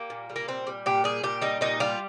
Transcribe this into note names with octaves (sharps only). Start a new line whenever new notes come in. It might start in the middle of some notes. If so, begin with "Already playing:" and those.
Already playing: G3 A#3
A#2
G3
A#3
A#2 C4
G3
A#2 G4
G3 G#4
A#2 G4
G3 D#4
A#2 D#4
G3 F4